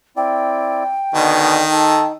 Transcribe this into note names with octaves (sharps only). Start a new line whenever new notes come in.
C4 E4 D5 G5
B2 D3 D#3
D#4 A4